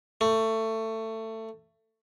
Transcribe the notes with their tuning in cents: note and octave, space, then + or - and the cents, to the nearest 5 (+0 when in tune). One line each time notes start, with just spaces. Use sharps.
A3 +20